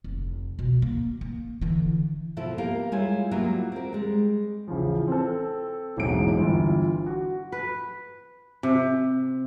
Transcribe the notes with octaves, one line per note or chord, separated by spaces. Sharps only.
F1
B2
A#3
A#3
D3 E3
B2 F3 E4 A4
A#3 B3 G4 A#4 F5 G5
G3 G#3 E4 F4 C#5 G#5
F#3 G3 A#3 B3 E4 F4
C4 A#4
G3 G#3
A1 C#3 F3
C4 A4
E1 A1 G#2 F#3 G#3 D7
G1 E3 F4
F#4
B4
C3